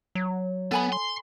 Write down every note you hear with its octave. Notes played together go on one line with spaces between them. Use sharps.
F#3
B3 A4 G#5 B5
C6